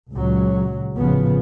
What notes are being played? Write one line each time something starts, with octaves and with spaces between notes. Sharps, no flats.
C#2 A#2 F#3
A1 C#3 F3 B3